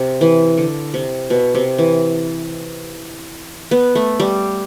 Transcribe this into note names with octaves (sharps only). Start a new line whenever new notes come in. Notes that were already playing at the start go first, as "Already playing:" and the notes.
Already playing: C3
E3
D3
C3
B2
C3
E3
B3
A3
G3